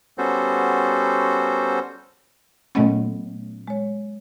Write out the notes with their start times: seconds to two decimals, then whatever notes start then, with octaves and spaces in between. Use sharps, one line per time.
0.18 G3 B3 C#4 F#4 A4 C5
2.75 A#2 F#3 A3 B3 C#4 D#5
3.67 G#3 C#5